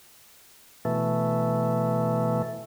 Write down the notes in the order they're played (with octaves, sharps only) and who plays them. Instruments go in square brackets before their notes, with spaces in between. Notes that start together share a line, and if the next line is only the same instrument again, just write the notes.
[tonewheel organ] B2 E3 A3